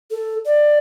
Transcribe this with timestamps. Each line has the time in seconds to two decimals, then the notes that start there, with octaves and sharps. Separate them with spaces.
0.11 A4
0.46 D5